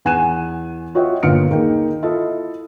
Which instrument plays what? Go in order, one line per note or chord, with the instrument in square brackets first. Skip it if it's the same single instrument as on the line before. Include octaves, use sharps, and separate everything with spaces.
[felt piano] E2 F#5 G#5 F#6 D#7 E7
F4 F#4 C#5 D#5 E5 G5
G1 A#2 F4 F6 C#7 D7
D#2 A#3 D#4 G#4 G5
E4 F4 A4 D#5